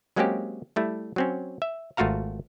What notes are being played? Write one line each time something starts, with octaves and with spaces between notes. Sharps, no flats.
F#3 G#3 A#3 C4 C#4 G4
G3 A3 E4
F#3 C4 C#4
E5
G#1 A3 F4 F#4 F5 A#5